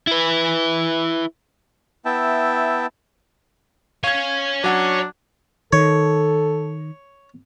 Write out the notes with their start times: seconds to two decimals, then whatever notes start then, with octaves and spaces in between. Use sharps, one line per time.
0.07 E4 B4
2.05 B3 E4 E5 G5 A5
4.04 C#5 F5 G#5 G#6
4.64 F#3 D4 F#5 A5
5.73 D#3 A4 C#5